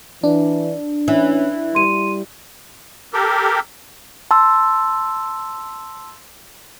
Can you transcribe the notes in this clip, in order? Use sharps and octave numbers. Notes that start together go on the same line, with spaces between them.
E3 D4
E3 C#4
G3 C6 D#7
G4 A4 A#4
A5 C6 E6